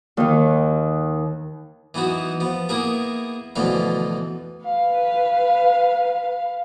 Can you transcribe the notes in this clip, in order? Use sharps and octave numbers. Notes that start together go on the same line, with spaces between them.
D#2 D#3
E3 B3 D#4 F#4
F3 B3
A#3 B3 E4 G#4 A#4
D2 B2 E3 F3 F4 B5
B4 F5